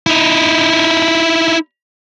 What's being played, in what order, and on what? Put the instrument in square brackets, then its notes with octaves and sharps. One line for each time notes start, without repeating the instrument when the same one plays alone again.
[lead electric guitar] D#4 E4